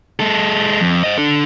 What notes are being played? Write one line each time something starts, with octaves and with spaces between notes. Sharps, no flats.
G#3 A4
F2
C5 D#5
D4 A4